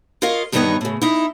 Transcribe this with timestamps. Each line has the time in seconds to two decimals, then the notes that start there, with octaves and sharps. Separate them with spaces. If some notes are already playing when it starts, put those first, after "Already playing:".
0.22 F4 A#4 C#5 D#5 F5
0.52 E2 G2 D#3 B3 D#4 C#5
0.81 A2 C#3
1.02 D#4 E4